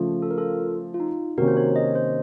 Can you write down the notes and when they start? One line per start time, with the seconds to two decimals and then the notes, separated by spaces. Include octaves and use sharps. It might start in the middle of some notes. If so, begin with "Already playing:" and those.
Already playing: C#3 F3 A3
0.22 A4
0.31 A#4
0.38 F4 A4
0.94 F4
1.00 D#4
1.37 C3 D#3 A#3 C#4 F#4 A#4
1.48 C5
1.57 A#4 C#5
1.76 C5 D#5
1.95 C5 D#5